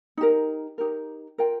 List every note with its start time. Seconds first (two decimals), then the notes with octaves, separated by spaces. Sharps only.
0.17 D#4 G4 A#4
0.78 D#4 G4 A#4
1.38 F4 A#4 G5